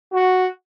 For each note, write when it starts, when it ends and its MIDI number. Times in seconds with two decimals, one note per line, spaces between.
0.12 0.46 66